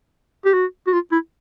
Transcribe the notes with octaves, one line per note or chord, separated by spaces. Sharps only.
G4
F#4
F#4
F4
E4